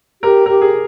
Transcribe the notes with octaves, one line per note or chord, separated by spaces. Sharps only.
G4 A#4
G4 A#4
G#4